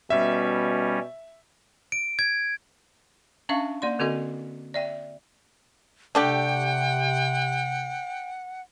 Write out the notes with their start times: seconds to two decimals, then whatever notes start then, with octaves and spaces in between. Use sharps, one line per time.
0.10 B2 G3 C#4 E5
1.92 D7
2.19 G#6
3.49 C#4 D4 E5 F5 C#6
3.82 A#3 D5 C6
3.99 D3 C4 F#4 A4 D#5
4.74 D5 E5 G5
6.15 C3 A3 D4 G4 F#5 G5